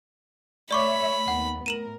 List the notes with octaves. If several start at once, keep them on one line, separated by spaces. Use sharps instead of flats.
A3 C#5 D5 E5 B5 C#6 D6
D#2 B3 F#5
A2 A#4 D#7 E7 F#7